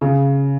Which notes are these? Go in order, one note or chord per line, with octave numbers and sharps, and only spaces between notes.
C#3